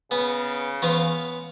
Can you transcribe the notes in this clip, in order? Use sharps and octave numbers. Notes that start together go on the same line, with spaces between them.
C#3 B3
E3 B3 F5 C6